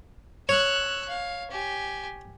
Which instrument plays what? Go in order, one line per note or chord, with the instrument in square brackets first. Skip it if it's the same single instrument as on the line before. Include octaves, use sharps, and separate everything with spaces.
[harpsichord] C#5 [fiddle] E6 F#6
[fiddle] F5
G4 G#5